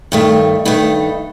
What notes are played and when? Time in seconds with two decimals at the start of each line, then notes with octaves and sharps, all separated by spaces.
0.12 G2 D#3 A3
0.65 G2 D#3 A3